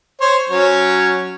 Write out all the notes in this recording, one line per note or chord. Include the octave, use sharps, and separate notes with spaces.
C5 C#5
F#3 C#4 C#5